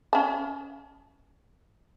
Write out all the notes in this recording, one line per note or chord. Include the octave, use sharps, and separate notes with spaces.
C#4 A5